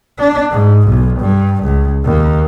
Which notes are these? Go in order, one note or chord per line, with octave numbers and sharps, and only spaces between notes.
D4
G#2
B1
G2
C#2
D#2